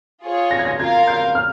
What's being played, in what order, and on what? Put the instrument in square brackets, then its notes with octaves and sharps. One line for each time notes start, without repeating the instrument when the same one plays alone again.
[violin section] F4 G#4 C#5
[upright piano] A#6
G#6
A#6
[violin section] F4 A#4 F5 [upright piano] G#6
[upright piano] G6
F6